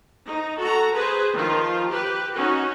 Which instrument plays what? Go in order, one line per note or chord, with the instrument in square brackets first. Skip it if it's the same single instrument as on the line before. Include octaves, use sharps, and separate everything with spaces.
[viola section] D#4
F#4 A4 A#5
G#4 B4 C5
D#3 F3 F4
G4 B4
C#4 D#4 F#4